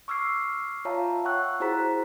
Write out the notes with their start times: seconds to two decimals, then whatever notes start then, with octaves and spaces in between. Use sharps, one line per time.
0.08 C#6 D6 E6 F6 G#6 C7
0.85 F4 C#5 E5 F5 A5 A#5
1.25 F#5 G5 C#6 E6 F#6
1.60 E4 F#4 G#4 C5 A#5 B6